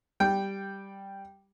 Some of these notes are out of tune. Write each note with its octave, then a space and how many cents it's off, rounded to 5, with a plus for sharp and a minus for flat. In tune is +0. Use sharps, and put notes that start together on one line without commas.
G3 +0 G5 +0